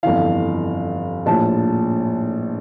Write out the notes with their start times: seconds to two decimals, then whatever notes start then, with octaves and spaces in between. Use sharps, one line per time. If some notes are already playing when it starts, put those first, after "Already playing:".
0.03 G1 F2 E3 F5
1.26 A#1 A2 F3 A5